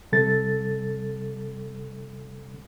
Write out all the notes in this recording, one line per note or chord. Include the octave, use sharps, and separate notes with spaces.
C3 G3 A4 A6